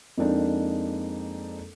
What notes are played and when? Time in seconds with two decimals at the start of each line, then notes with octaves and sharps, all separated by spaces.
0.17 F2 G#3 A#3 C4 D4 D#4